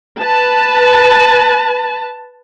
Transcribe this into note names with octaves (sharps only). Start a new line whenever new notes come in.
B4 A5